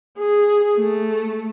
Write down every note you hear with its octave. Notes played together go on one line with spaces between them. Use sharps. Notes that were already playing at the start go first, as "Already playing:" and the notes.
G#4
A3